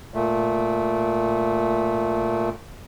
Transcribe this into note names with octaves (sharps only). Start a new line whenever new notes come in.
A#2 A3